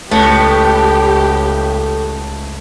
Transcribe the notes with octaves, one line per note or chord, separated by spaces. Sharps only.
C#2 A2 A3 B3 G4